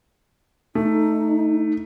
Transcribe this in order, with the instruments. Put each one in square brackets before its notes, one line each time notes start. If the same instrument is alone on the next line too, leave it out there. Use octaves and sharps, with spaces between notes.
[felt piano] A3 [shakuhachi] D#4